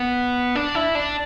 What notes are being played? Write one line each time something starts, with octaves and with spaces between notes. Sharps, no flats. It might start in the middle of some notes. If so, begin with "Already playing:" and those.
Already playing: B3
D4
E4
D4